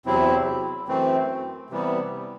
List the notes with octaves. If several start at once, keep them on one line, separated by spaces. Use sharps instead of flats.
E2 C3 F#3 C4 E4
F#2 E3 A3 C4
C3 E3 G3 B3